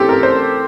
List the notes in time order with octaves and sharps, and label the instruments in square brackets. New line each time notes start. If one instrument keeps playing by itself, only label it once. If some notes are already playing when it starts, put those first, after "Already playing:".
Already playing: [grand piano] E3 A3 C4 G4 A4
A#4
C5